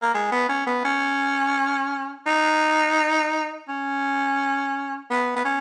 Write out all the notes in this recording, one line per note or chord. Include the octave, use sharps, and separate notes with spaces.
A#3
G#3
B3
C#4
B3
C#4
D#4
C#4
B3
B3
C#4